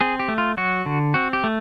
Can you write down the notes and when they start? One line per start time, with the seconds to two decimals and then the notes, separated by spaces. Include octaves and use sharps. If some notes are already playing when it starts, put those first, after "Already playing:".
0.01 C4 G#4
0.19 G4
0.28 A3
0.38 F4
0.57 F#3 F#4
0.86 D3
1.14 C4 F#4
1.33 G4
1.44 A3